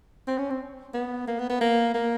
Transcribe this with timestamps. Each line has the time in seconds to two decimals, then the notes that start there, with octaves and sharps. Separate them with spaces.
0.27 C4
0.38 C#4
0.50 C4
0.94 B3
1.28 A#3
1.39 B3
1.49 B3
1.61 A#3
1.95 A#3